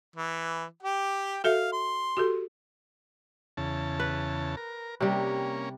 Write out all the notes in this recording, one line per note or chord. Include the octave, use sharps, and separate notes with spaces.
E3
G4 G5
F#4 A4 E5 F5
C6
F#4 G4 A4
E2 C#3 A5
B4
A#4
C3 G3 A#3 C#4